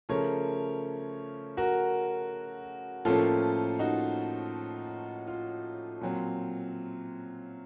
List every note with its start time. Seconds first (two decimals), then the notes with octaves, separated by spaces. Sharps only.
0.09 C#3 F3 A3 A#4 C#5
1.57 F#4 A#4
3.05 A2 F3 A#3 C#4 F4 A4
3.79 D#4 F#4
5.27 F4
6.01 A#2 F#3 C4